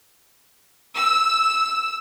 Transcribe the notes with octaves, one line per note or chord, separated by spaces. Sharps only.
E6